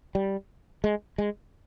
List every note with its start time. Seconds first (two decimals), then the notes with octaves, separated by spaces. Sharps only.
0.15 G3
0.84 G#3
1.18 G#3